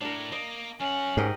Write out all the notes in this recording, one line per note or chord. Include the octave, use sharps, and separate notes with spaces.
A2 D4 A#4
A#3 D#5
F#2 C#4 F#5
G#2 G4 A#4 D#5